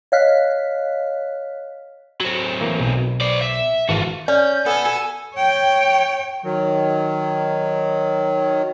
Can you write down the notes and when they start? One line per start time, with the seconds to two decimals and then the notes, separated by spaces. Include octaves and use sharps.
0.12 C#5 D#5 F5 F6 F#6 B6
2.20 F#3 C4
2.60 E3 A#3 A#4
2.80 B1
3.21 C5 D5
3.42 E5
3.89 G#1 E3 F4 F#4 A5
4.28 C#4 D5 G6
4.66 B3 A4 G#5
5.35 C#5 G5
6.44 D#3 F#3